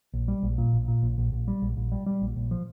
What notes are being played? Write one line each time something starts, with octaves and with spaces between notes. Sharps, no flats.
A#1
G3
A#1
A#2
A#1
A#2
A#1
A#1
A#1
G3
A#1
A#1
G3
G3
A#1
A#1
F3